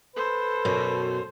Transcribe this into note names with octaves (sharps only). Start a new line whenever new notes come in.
A4 B4 C5
F#2 B2